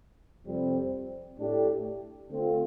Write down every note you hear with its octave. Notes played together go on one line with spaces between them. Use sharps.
F2 C3 G3 C4
A2 A3 D4 G4
D3 A3 C4 F4